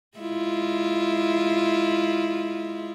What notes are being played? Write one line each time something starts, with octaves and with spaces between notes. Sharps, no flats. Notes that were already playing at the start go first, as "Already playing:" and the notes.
G#3 E4 F4